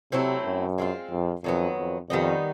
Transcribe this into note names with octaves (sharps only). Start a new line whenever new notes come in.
C3 F#3 A3 C4 E4
F#2
G#3 C4 F4
F2
F2 D#3 F#3 B3
F2
F2 D#3 G3 B3 D#4